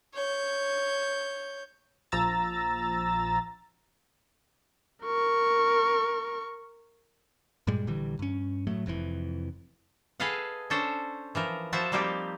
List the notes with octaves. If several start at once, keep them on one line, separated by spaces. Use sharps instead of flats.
C#5 G6
A#1 F3 A#5 E6 A6
A#4 C#6
G2 A#2 G3 G#3
A#1 D3 E3 G3
G2 C#4
A2 F#3 A3
F1 F2 B2 E3
G#4 A4 B4 D#5 F5 F#5
C#4 D4 A4 C5 C#5
E3 F3 A#4
F3 E4 F#4 C5 E5 A5
F3 G3 A#3 C4 D#4 G4